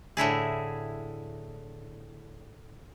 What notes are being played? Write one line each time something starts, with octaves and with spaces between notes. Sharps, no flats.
A2 D3 E4 G#4